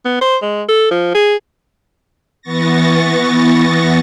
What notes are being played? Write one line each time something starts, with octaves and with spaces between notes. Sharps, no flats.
B3
C5
G#3
A4
F3
G#4
E3 B3 C#6 A6 A#6